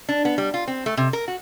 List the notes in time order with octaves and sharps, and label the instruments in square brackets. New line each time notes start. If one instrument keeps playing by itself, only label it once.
[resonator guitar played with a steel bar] D4
B3
G3
F4
C4
A3
C3
A#4
F#4